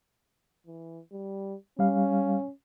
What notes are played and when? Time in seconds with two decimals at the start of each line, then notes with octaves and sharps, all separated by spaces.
0.66 E3
1.12 G3
1.79 G3 C#4 F5